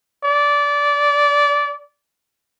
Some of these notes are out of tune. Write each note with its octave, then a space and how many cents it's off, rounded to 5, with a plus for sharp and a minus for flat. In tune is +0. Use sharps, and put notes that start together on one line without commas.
D5 -20